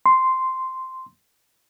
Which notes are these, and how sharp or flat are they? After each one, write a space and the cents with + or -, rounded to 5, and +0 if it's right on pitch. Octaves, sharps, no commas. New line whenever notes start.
C6 -5